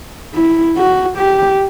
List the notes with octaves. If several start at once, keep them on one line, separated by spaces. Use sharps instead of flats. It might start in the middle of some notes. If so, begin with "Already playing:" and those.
E4
F#4
G4